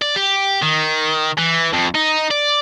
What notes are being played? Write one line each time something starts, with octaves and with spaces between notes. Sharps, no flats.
D5
G4
D#3
E3
F2
D#4
D5